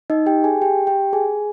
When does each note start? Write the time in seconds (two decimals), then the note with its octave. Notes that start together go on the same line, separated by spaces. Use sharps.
0.10 D#4 D#5
0.26 G4 G5
0.44 G#4 G#5
0.62 G4 G5
0.87 G4 G5
1.13 G#4 G#5